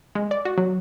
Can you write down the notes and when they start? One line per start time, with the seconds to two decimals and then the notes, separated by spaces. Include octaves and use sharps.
0.15 G#3
0.31 D5
0.45 F#4
0.58 F#3